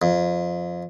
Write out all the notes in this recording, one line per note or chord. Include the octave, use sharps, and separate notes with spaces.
F2